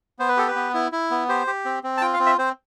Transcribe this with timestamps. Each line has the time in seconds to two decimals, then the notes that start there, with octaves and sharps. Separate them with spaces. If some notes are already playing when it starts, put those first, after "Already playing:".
0.19 B3 C5
0.29 B4
0.37 G4 A4
0.48 B4
0.56 B3
0.74 E4
0.92 E4
1.11 B3
1.29 G4 C5
1.47 G4
1.65 C4
1.83 C4
1.97 A5
2.01 F4 G5
2.14 F5
2.19 C4
2.26 E5
2.38 C4 C5